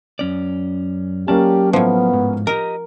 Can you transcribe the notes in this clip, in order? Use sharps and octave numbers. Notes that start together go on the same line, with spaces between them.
F#2 C#4 D5
F#3 A#3 C#4 G4 D5 A5
A2 F3 B3
G#2
G4 A#4 D#5 A#5